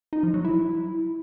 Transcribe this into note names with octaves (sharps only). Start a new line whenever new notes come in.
D#4
F3
F#3
E4